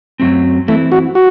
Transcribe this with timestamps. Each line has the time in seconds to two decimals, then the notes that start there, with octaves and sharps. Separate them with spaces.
0.20 F#2 D#3 F#3 A3 C4
0.68 E3 A3 C4 E4
0.92 F#4
1.15 F#4